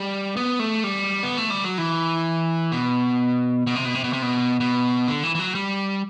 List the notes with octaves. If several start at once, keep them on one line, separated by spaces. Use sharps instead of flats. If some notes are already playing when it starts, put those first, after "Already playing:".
Already playing: G3
B3
A3
G3
B3
A3
G3
F#3
E3
B2
B2
C3
B2
C3
B2
C3
B2
B2
D3
E3
E3
F#3
G3